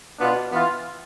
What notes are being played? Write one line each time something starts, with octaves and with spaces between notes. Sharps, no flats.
B2 B3 D4 F4
E3 B3 F4